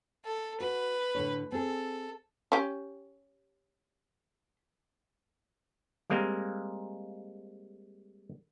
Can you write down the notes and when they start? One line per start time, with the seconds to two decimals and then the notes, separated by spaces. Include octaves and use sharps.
0.25 A4
0.60 F#4 B4
1.15 A2 D3 C#5
1.52 C4 G#4 A4
2.52 C#4 G4
6.10 G3 G#3 A#3 C4